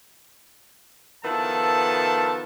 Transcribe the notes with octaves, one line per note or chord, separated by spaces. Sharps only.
D#3 F3 B3 E4 A4 A5